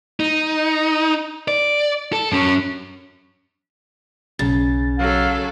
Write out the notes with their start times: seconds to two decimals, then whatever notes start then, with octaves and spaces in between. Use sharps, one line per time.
0.20 D#4
1.48 D5
2.13 A4
2.32 F#2 C#4
4.39 B1 C#3 A6
4.99 F#3 A4 F5